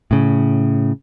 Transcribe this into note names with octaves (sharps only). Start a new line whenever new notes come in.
A2 C#3